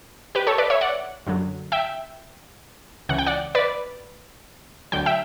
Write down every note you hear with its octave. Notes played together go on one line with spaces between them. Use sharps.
G4 B4
A4 C#5
B4 D5
C#5 E5
D5 F#5
F#2 D3 F#3
E5 G5
C#2 C#3 E3 F#5
G5
D5 F#5
B4 D5
D2 D3 F#3 G5
E5 G5